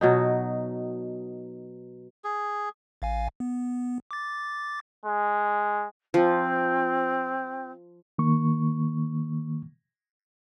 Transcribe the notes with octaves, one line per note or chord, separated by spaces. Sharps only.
B2 F#3 D#4
G#4
A1 F5 G#5
B3
D6 A6
G#3
F3 C4
D#3 A#3 C#6